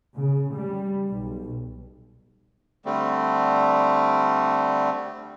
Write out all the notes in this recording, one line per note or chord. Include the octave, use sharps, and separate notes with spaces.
C#3
G3
B1
D3 G3 A3 C4